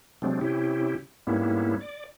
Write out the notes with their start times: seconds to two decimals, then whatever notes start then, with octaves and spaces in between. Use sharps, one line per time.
0.22 C3 F#3 G#3 A3 C4 D4
0.41 C3 C#4 E4 G4
1.27 G#2 G3 A#3 B3 C#4 E4
1.81 D5